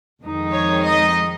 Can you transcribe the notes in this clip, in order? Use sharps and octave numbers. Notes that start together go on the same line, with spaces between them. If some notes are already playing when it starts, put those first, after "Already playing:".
F2 D#3 G#3 D#4
C#5
D#5